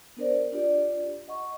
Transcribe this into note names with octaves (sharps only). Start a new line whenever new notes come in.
B3 D4 A#4 C5 D5
D4 F4 G4 D5
D#5 F#5 C#6